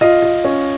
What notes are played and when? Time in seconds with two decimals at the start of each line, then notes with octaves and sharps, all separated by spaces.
0.01 F4 D#5
0.22 F4
0.44 C#4